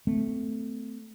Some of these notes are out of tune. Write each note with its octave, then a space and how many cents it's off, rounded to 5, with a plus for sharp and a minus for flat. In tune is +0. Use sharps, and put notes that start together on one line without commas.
A3 +0 C4 -40